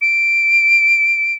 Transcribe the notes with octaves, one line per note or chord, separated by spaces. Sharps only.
D7